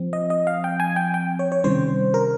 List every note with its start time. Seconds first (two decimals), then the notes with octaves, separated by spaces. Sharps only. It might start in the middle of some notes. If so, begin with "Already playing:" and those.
Already playing: F3 C4
0.13 D#5
0.30 D#5
0.47 F5
0.64 G5
0.80 G#5
0.96 G5
1.14 G5
1.39 C#5
1.52 C#5
1.64 C3 D#3 G3 C#4 C5
2.14 A#4